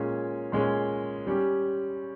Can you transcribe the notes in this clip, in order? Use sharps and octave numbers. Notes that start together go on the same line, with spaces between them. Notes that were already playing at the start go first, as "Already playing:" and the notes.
Already playing: A#2 G#3 C#4 G#4 C#5
A#2 G#3 C#4 G#4 C#5
G3 C#4 G4